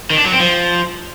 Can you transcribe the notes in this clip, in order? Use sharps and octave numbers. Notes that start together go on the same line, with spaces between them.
D#3
D4
F#3
C4
F3